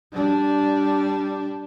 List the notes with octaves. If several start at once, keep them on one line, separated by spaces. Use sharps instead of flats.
G3 D4